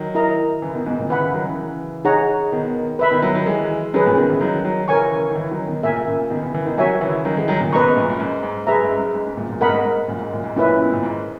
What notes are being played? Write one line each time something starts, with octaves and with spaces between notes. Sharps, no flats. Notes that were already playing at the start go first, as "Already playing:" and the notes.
Already playing: D#3 F#3
E4 A#4 D#5 A#5
C#3 E3
B2 D#3
G#2 B2
A#2 C#3
C#3 E3 B4 F#5 B5
C#3 E3
D#3 F#3
C#3 E3
D#4 G#4 C#5 F#5 A#5
B2 D#3
B4 E5 B5
B2 D#3
D#3 F#3
D#3 F#3
E3 G#3
D#3 F#3 C#4 G#4 B4
A#2 C#3
B2 D#3
C#3 E3
D#3 F#3
D#3 F#3
C#3 E3 A#4 C#5 G#5 C#6
D#3
C#3 E3
D#3 F#3
B2 D#3
A#2 C#3 A#4 E5 G#5
A#2 C#3
B2 D#3
C#3 E3
C#3 E3
B2 D#3
D#3 F#3 F#4 C#5 E5 G#5
C#3 E3
D#3 F#3
E3 G#3
D#3 F#3
A#2 C#3
G#2 B2 B4 D#5 A#5 C#6
F#2 A#2
F#2
G#2
G#2
F#2 G#4 B4 E5 A#5
G#2
F#2
G#2
G#2
F#2 A#2
F#2 A#2
G#2 B2 A#4 D#5 F#5 B5
G#2
G#2
G#2
F#2 A#2
G#2
F#2 A#2
G#2
F#2 A#2 C#4 E4 B4 E5
B2
A#2
G#2